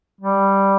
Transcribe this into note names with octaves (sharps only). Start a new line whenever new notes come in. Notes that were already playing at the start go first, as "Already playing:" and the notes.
G3